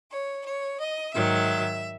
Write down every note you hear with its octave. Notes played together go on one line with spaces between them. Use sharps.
C#5
C#5
D#5
G#2 D#3 F#3 E5